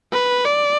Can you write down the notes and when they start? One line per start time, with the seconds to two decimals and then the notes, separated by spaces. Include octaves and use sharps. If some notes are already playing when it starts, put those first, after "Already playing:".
0.12 B4
0.45 D5